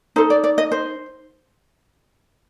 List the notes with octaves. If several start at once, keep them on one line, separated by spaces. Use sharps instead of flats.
D#4 A4 C5
D5
D5
D#5
C5